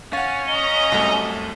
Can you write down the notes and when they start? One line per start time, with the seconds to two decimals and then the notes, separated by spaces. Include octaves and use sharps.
0.13 C#4 F5 F#5 A6
0.47 D#5 A#5 G7
0.92 C2 F#2 A3